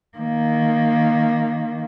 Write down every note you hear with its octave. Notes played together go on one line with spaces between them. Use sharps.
D#3 A#3